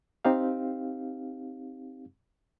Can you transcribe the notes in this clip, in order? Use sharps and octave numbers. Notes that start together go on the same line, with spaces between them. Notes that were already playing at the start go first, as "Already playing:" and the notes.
C4 D#4 G4 F5